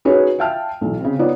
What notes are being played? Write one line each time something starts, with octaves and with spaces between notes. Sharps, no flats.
C#4 D#4 F#4 G#4 B4 C#5
E5 F5 G5 A5 F6
B1 E3
C#3 C4
B3 D#4 F4 C#5 D5